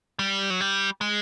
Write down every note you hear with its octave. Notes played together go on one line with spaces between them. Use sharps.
G3
F#3
G3
G#3